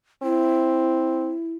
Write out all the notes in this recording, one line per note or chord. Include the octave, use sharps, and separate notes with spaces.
C4 E4